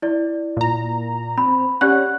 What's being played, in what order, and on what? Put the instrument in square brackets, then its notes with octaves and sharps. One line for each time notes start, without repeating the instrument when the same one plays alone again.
[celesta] E4 D5
[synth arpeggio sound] A#2 A#5
[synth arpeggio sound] C4 [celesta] B5
[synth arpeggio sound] C#4 F#5 [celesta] G4 D5 F#6